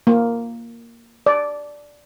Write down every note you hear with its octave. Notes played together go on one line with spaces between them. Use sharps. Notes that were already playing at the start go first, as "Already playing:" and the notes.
A#3
D5